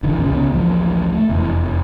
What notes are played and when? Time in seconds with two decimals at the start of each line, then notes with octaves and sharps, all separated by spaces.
0.03 D#1 D3 E3
0.15 G1 D#2 A#2 C#3
0.30 C#2 C#3 B3
0.52 A1 D2 F3 A#3
1.13 A3
1.29 F1 E2 E3